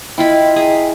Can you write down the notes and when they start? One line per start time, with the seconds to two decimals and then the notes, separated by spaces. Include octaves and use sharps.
0.18 E4 F4 D#5 G5 B5
0.56 G#4 A#5 B5